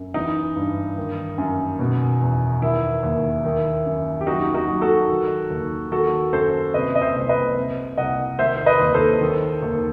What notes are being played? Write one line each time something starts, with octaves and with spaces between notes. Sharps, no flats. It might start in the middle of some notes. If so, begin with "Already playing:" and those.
Already playing: F#2
E3 D#4
G2
D#3
F#2
B2
E2
D#3 E4
D#2
D#3
F#2
G4
F#3 D#4 F#4
D#4 F#4
F#3
F#4 A4
D#3
D#2
D#3 F#4 A4
F#2 A4 C5
C3 B4 D#5
D#5
C5 E5
C2
B4 D#5
C3
C2 D#5 F#5
D#3 C5 E5
C5
B4 D#5
D#2
A4 C5
D#3
D#2